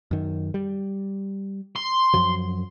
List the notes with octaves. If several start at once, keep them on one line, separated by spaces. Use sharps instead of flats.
F#2 D#3
G3
C6
F#2 F3 F#3